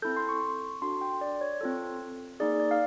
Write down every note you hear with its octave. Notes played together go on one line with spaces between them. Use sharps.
C4 E4 A4 G6
C6
C#6
D4 F#4 A4 C6
G5
D5
C#5
C4 F4 A4
A#3 D#4 G#4 D5
D5
F5